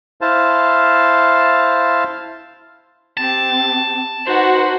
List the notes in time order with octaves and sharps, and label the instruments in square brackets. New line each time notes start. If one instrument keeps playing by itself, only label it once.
[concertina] E4 C5 F5 A5
[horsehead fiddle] C4 G4 [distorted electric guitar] A5
[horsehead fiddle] D#4 B4 [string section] F#4 [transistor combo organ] C5